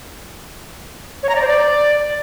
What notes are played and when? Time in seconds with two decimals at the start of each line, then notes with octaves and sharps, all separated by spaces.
1.23 C#5
1.29 A#5
1.35 D5
1.42 C5
1.48 D5